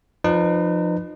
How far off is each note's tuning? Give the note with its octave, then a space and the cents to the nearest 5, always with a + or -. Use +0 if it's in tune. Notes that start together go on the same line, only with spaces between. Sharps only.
F3 +0 D#4 -35 B4 +0